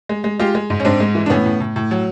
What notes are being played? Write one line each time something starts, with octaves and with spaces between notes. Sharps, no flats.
G#3
G#3
G#3 F4 G4
G#3
G#2
C#4
G#2 C4 D4
G#3
E3
D4
A2 B3 C#4
A2
A2
A2
F#3